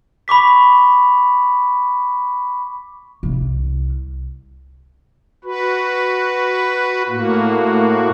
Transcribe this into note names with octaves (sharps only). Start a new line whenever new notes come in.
B5 C#6 D6 B6
C2
F#4 B4
A2 A#3 F#4